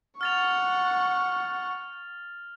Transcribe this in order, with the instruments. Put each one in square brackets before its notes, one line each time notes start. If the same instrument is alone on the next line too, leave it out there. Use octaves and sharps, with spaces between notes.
[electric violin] F#5 C#6 [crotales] F6 A6 F7